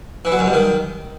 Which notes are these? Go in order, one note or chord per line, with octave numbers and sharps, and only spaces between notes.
E3
F#3
F#2
G2
D#3